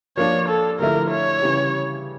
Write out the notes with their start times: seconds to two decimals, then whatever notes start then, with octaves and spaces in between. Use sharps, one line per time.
0.17 F3 A#3 D4 C#5
0.48 A4
0.79 D3 F3 A3 E4 A#4
1.11 C#5
1.42 C#3 E3 G3